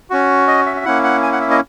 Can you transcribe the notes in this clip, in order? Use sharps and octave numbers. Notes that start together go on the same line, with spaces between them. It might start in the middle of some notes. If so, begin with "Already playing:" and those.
C#4 F#4
D#5
E5
E5
A#3 C#4 E4 F#5
F#5
G#5
F#5
E5
D#5